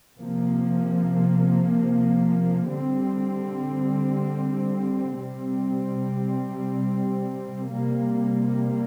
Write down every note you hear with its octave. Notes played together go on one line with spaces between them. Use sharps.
C3 F3 A#3
D3 G3 C4
C3 G3 C4
C3 G3 A#3